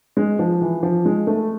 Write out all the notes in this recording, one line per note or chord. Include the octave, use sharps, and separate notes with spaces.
G#3
F3
E3
F3
G#3
A3